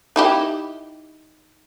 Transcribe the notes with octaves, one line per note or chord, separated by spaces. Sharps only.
D#4 E4 G4